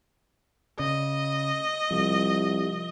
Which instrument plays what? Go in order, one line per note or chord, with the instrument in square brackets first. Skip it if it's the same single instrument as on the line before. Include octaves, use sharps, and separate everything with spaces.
[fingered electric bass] C#3 [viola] D#5
[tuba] C2 [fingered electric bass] F3